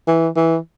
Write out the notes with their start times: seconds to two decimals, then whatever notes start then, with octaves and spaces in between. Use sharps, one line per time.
0.07 E3
0.36 E3